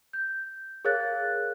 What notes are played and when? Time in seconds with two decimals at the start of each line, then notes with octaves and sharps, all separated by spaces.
0.13 G6
0.85 G#4 A#4 C#5 F5 F#6 A6